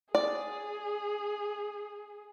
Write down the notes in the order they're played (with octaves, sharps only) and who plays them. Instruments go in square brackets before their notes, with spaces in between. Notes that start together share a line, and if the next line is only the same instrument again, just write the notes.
[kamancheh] G#4 [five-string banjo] D5